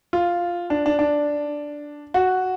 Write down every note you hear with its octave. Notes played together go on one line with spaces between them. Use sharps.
F4
D4
D4
D4
F#4